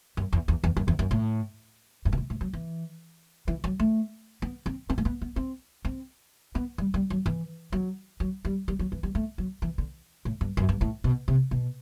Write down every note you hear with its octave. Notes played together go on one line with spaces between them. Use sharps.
F#2
E2
E2
E2
F#2
E2
F#2
A2
G2
B2
A2
A2
F#3
E3
E3
F#3
A3
B3
C4
C4
A3
B3
B3
C4
C4
B3
G3
G3
F#3
E3
F#3
F#3
G3
G3
F#3
E3
G3
A3
F#3
E3
D3
A2
G2
F#2
G2
A2
B2
C3
B2